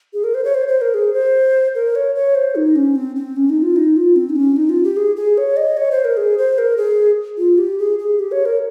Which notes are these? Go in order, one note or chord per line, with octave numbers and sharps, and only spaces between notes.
G#4
A#4
C5
C#5
C5
C5
A#4
G#4
C5
A#4
C#5
C#5
C5
D#4
C#4
C4
C4
C#4
D#4
F4
D#4
F4
C4
D#4
C#4
D#4
F4
G4
G#4
G#4
C#5
D#5
C#5
C5
A#4
G#4
C5
A#4
G#4
F4
G4
G#4
G#4
G4
C#5
A#4